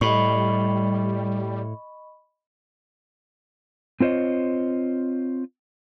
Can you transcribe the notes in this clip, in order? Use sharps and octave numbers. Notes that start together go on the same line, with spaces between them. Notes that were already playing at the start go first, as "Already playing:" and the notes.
A2 G3 D#5 B5 C#6
C4 F4 C5 C#5 D#5